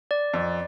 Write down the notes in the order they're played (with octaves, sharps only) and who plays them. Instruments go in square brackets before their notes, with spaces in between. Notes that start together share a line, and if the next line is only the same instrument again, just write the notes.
[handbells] D5
[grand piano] F2